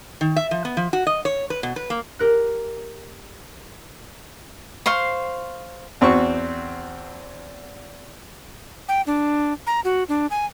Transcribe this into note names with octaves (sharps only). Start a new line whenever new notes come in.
D#3
E5
F3
B3
F3
F#4
D#5
C#5
B4
B2
B4
A#3
G4 A#4 F#6
C5 F5 C6 C#6
E2 C4 F#4 C#6
G5
D4
A#5
F#4
D4
G#5